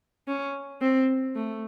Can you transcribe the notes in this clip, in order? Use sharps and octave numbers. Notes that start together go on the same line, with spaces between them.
C#4
C4
A3